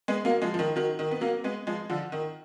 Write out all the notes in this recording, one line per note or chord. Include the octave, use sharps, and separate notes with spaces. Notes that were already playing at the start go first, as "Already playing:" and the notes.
G#3 B3
F#3 A#3
F3 G#3
F3
D#3
D#3 F#3
D#3
B3
F#3 A#3
G#3 B3
F3 G#3
D3 F3
D#3